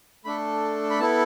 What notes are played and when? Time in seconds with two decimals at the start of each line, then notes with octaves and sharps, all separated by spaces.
0.25 A3 D4 A4 B5
0.90 B5
1.00 B3 E4 A4 A5